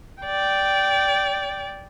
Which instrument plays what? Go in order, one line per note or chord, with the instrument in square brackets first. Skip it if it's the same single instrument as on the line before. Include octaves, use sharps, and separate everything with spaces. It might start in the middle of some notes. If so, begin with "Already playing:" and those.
[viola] D5 G5